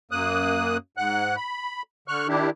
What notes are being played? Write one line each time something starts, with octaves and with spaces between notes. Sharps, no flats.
F#2 A#3 D#6 F#6
G#2 F#5 F#6
B5
D3 C#6 F6 F#6
D#3 D4 E4 G4